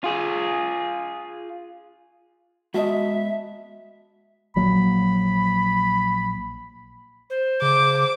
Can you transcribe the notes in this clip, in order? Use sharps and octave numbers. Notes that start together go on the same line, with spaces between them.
F4 G#4
G#3 B3 F#4 D#5 E5 A5
A#1 F#3 A#3 B5
C5
C#3 D6